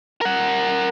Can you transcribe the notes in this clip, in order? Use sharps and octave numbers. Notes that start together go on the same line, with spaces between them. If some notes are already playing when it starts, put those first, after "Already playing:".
A#4 F#5